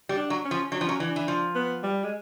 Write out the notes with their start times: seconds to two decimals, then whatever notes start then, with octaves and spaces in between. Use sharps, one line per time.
0.09 G3
0.17 D4
0.30 F#3
0.45 C#4
0.51 F3
0.72 F#3 D4
0.81 F3
0.86 F#3 C#4
1.00 E3 D4
1.16 E3
1.28 F3
1.55 B3
1.83 G3
2.04 G#3